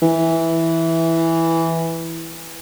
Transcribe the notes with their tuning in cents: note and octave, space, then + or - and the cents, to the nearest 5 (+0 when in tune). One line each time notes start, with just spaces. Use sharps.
E3 -5